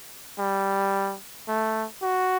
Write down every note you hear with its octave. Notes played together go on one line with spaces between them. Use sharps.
G3
A3
F#4